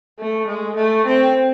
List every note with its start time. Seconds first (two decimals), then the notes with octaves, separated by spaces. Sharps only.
0.19 A3
0.48 G#3
0.76 A3
1.06 C4